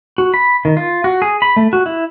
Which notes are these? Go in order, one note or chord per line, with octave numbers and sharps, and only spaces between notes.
F#4
B5
D#3
F4
F#4
G#4
B5
A3
F#4
E4